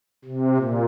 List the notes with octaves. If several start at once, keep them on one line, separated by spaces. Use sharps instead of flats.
C3
A#2